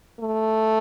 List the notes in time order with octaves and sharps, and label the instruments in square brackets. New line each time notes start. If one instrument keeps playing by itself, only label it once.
[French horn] A3